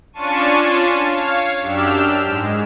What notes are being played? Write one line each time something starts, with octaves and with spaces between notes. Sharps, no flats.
C#4 D4 F4 A5 C#6 D#7
C#5 F5
F#2 D4 G4 E6 F6 E7
G#2 G#3